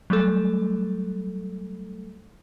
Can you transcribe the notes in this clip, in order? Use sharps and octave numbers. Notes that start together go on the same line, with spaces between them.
F#3 G3 A3 A4